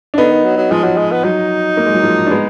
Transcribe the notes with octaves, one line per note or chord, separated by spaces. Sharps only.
D4
D3 B3 D#4
D#3
F#3
F#3
F3 G#3
F#3
G#3
B3
F#3 D#4
A#3
G#3
F#3
F3 G#3
D4
G#3 B3